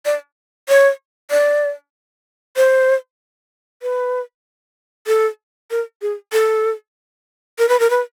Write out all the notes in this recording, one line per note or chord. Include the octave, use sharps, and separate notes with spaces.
D5
C#5
D5
C5
B4
A4
A#4
G#4
A4
A#4
B4
A#4
B4